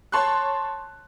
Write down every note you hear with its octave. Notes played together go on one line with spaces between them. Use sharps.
C#5 A5 C6 C#6 F#6